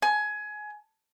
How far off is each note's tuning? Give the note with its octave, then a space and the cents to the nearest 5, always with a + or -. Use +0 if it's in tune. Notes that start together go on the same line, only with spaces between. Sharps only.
G#5 +20